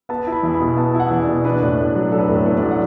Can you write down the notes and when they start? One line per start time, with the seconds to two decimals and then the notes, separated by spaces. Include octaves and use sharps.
0.09 B3 A5
0.27 E4
0.32 B5
0.43 E2
0.54 B5
0.60 B2
0.77 B3 A5
0.94 E4
1.00 F#5
1.11 E2
1.22 D5
1.27 B2
1.44 D4 B4
1.62 A2
1.78 A2
1.95 F#3
2.12 D4 A4
2.19 B4
2.26 A2 A4
2.35 B4
2.46 A2
2.57 D5
2.63 F#3
2.71 F#5